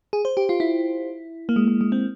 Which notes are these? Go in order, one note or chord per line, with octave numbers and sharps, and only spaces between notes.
G#4
C5
G4
F4
E4
A#3
G#3
G#3
G#3
C4